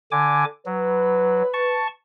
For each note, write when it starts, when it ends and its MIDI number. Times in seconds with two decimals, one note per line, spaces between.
0.12 0.45 50
0.12 0.45 80
0.12 0.45 86
0.66 1.43 54
0.66 1.93 71
1.53 1.87 81
1.53 1.87 85